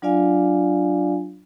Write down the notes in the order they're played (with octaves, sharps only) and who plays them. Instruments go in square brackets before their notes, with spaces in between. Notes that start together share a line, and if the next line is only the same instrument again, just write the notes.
[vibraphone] F#3 D4 F4 D5 F5 G#5